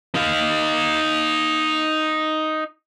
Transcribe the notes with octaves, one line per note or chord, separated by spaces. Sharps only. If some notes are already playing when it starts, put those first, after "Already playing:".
D#4 F5